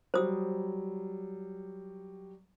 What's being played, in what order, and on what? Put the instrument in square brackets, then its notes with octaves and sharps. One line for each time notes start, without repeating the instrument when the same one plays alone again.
[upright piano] F#3 G3 [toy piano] C5 D#6 E6